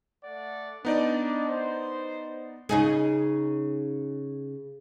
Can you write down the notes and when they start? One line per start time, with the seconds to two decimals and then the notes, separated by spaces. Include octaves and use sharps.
0.24 A3 D5 F#5
0.85 B3 D4 D#4 D5
1.49 C5
2.69 C#3 D#4 G#4